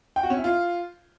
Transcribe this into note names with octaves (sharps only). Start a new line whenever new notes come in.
G5
F#4
C#4
E4
F4